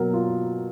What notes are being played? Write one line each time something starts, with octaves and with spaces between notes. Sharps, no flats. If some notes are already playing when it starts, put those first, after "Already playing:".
Already playing: B2 F#3 A#3 A#4
F4